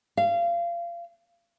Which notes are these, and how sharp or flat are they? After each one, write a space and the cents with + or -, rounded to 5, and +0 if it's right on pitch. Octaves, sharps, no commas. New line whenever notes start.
F5 -25